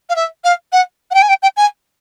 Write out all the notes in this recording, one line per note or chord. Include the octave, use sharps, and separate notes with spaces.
F5
E5
F5
F#5
F#5
G5
G#5
G5
G5
G#5